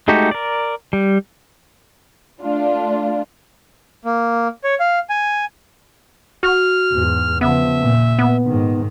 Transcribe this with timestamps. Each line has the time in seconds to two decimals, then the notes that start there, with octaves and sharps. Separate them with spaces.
0.08 G#3 A3 D#4 F#4 G4
0.31 A#4 D5
0.93 G3
2.42 A3 D4 F4
4.05 A#3
4.64 C#5
4.80 F5
5.10 G#5
6.43 F#4 F6
6.92 E2 G#2
7.41 C#3 F3 B3 E5
7.80 A#2
8.19 B3
8.47 G#2 D#3